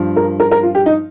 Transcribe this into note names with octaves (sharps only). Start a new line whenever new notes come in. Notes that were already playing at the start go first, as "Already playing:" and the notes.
Already playing: G2 F3
A#4
A#4
A#4
F4
G4
D#4